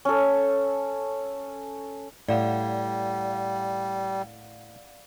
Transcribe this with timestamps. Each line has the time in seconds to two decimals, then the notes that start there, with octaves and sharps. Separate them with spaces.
0.05 C#4 A4
2.29 A2 G3 D5 F5 F#5